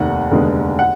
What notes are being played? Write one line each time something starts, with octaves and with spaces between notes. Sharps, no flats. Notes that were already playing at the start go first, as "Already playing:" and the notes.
Already playing: F1 D#2 D#3 F#5
F1 D#2 D3 G#3 B3
F#5